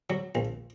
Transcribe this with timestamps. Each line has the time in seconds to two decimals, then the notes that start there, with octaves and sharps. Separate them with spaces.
0.10 F#3
0.35 A#1